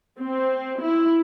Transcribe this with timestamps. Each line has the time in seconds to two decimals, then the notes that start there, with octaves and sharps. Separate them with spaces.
0.19 C4
0.81 E4